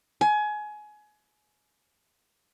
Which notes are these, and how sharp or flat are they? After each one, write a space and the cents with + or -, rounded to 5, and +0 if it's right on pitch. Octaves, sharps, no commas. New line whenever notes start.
G#5 +25